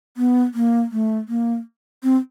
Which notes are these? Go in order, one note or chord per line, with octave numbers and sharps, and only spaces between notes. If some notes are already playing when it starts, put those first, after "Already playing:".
B3
A#3
A3
A#3
C4